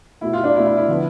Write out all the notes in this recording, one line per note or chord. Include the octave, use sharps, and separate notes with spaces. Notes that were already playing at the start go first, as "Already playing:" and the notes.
B2 A3 E4
F4
D4
B2 A3 E4
E4
E4
D3 F3 B3